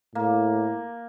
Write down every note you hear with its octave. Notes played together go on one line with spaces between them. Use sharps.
A2 A#3